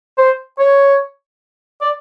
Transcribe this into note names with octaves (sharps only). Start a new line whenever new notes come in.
C5
C#5
D5